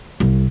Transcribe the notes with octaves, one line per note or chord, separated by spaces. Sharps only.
C2